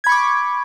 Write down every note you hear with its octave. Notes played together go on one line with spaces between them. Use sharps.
B5 C#6 D6 G#6